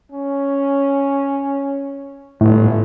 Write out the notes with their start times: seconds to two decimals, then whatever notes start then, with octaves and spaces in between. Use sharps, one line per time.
0.12 C#4
2.41 G1 A2